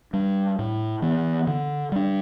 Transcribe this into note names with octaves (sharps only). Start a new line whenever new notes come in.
G3 D4
A2
E3 B3
D3
G3 D4